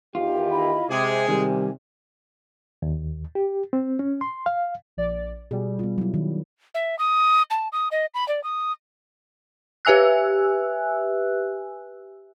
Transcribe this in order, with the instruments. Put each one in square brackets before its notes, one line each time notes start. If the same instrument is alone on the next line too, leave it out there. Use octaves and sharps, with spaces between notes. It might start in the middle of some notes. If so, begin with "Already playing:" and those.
[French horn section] E2 D#3 G4 [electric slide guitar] F4
[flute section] E4 D#5 B5
[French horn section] C3 [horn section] G#3 G#4 [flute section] D6
[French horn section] C3 [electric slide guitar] D#3 G3 [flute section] G#5
[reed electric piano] D#2
G4
C4
C#4
C6
F5
[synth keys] A#1 D5
[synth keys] B2 G3 [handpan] G#4
[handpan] B3 F4
F#3 E4
D#3
[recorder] E5
D#6
A5
D#6
D#5
B5
D5
D#6
[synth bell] G4 B4 E5 G#5 E6 F#6